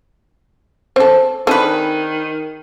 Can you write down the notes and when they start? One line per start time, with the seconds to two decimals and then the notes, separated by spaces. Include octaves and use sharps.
0.96 C4 A4 C5
1.47 D#3 C4 D4 G#4 A4 B4